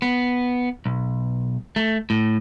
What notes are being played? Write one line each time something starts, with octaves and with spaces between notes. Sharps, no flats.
B3
B1
A3
A2